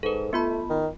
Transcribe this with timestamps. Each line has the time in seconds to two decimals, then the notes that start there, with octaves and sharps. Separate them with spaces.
0.03 G#2 A4 B4
0.33 A3 B3 F4 B5
0.70 D#3